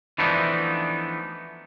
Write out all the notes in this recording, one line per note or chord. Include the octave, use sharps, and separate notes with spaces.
E3 F3 A3 B3 D4 D#4